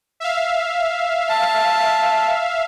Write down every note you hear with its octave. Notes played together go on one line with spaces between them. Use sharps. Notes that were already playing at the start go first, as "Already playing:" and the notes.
E5 F5
A5